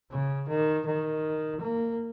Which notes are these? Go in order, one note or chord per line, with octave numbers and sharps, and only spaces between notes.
C#3
D#3
D#3
A#3